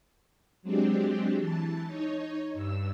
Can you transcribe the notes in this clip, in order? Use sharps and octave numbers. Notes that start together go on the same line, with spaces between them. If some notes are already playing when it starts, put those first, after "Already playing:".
F#3 G#3 C4 D4 G4
E3 A5
D#4 C#5
G2 E6